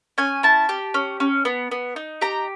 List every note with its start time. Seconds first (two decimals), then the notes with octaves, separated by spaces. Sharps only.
0.18 C#4 G#5
0.43 E4 A5
0.69 G4
0.94 C#4
1.20 C#4
1.45 B3
1.71 B3
1.96 D#4
2.21 G4 A#5